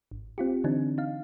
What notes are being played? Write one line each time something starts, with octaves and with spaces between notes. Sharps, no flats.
G#1
C4 F4 G4
D3 E3 C4 D4 D#4
D#4 F5